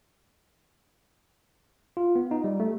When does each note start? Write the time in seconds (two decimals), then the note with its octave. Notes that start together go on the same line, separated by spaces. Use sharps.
1.97 F4
2.16 B3
2.31 D#4
2.44 G3
2.60 A3